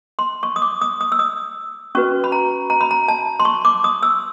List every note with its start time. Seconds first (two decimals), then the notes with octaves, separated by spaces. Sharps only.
0.19 C6
0.43 C#6
0.56 D#6
0.62 D6
0.81 D#6
1.01 D#6
1.12 E6
1.19 D#6
1.95 C#4 F#4 B4 C#6
2.24 B5
2.32 A#5
2.70 A#5
2.81 B5
2.91 A#5
3.08 A5
3.40 C6
3.45 C#6
3.65 D6
3.84 D#6
4.03 E6